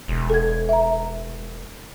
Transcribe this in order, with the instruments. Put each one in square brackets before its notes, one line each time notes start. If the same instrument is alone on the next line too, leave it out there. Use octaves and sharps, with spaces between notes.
[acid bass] E1
[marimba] A4 G#6
E5 A#5